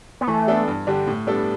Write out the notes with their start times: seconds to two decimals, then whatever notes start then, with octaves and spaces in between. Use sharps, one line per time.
0.21 B3
0.27 E3 A3
0.48 B3 D4 A4
0.68 G2
0.87 D3 G3 D4 G4
1.07 A2
1.27 G3 B3 D4 A4